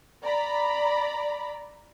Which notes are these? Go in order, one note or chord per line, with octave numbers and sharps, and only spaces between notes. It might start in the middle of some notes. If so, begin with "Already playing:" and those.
D5 A#5 B5